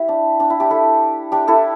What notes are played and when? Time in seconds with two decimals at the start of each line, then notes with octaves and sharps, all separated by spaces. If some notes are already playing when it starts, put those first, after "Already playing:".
Already playing: E4 G4
0.09 D4
0.40 D4
0.50 E4
0.60 D4 G4
0.70 E4 A4
1.32 D4 G4
1.48 E4 A4